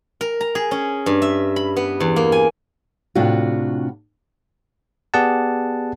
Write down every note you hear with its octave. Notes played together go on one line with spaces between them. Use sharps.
A#4
A#5
G#4
C#4
G2
E5
B5
B3
E2
A#3
G#5
A2 C3 D4 F4 F#4
B3 G4 G#4 D5 F#5 A5